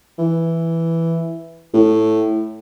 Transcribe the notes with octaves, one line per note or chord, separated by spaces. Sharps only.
E3
A2